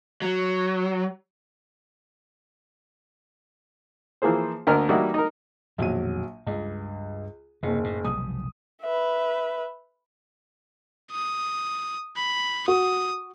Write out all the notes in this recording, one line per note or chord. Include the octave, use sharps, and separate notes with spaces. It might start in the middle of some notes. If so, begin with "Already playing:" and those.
F#3
E3 F3 A#3 G#4 C5
D2 A#3 A#4 D#5 F#5 F6
E3 G3 A#3 D#4 E4 F#4
D#4 A#4
A#1 F2 B2 D#3 F#3 D#7
C#2 G2
F#1 D#2 C3
A2
F1 B1 G3 D#6
B4 E5
D#6
B5
F#4 D#6